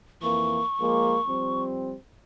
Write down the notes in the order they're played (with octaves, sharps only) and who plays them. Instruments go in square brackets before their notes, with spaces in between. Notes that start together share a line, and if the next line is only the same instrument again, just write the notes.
[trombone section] F2 E3 A#3 [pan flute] C#6
[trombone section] F3 G#3 A#3
F3 G3 C4